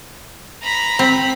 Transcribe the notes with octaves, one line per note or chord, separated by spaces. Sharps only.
A#5 B5
C4 B5